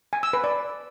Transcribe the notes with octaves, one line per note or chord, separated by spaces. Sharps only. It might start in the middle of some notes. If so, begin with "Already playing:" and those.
G#5
E6
B4
D5